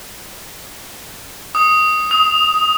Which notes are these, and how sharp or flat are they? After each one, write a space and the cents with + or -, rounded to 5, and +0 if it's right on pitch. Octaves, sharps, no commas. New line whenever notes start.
D#6 +5
D#6 +25